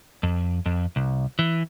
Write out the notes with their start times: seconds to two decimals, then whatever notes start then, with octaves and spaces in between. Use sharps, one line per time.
0.23 F2
0.66 F2
0.96 C2
1.39 E3